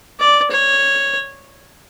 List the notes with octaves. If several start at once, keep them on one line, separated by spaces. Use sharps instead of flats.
D5
C#5